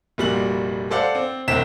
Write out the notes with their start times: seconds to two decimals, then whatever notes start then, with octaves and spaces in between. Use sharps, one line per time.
0.18 F1 A#2 G3 F#4 F#7
0.91 A4 C5 D5 F5 F#5
1.15 C4
1.48 E1 C2 C4 B6 E7